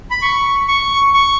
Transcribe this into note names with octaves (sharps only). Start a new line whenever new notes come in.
B5
C#6
C#6
C#6